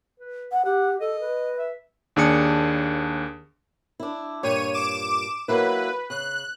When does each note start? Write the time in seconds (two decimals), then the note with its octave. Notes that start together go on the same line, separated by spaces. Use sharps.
0.20 B4
0.52 F#5
0.65 G4 F#5
1.00 A4 D#5
1.21 B4
1.58 E5
2.16 D#2 D4 G#4 D#6 C#7
4.00 D4 E4
4.43 G2 A#2 C#5 D#7
4.73 D6 E7
5.48 F#3 A#3 E4 B4
6.10 C#3 F#6